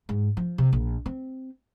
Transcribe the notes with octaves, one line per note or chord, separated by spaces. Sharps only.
G#2
F3
C3
A#1
C4